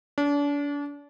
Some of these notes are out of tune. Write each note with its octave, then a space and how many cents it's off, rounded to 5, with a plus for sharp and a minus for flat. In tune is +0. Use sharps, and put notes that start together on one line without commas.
D4 -35